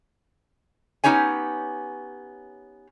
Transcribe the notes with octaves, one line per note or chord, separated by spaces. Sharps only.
B3 C#4 D#4 G4 C#5 G#5